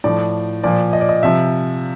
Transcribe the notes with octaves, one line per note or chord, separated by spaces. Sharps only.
A2 F3 D5
A#2 F3 D5
D#5
D5
D#5
C3 F3 E5